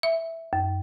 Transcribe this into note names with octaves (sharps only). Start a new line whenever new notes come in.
E5
F#2